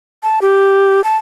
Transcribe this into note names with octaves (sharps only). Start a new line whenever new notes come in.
A5
G4
A5